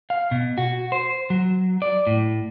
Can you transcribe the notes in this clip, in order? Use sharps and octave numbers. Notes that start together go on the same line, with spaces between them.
F5
B2
F#4
C5
F#3
D5
A2